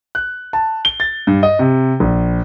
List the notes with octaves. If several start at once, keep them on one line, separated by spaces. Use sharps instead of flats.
F#6
A5
G7
A6
G2
D#5
C3
A#1